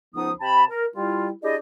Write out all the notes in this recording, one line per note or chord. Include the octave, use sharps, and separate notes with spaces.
C#2 F3 B3 D#4 D#6
C3 G5 A5 B5
A#4
G3 E4 F4
D4 E4 G4 G#4 D5 D#5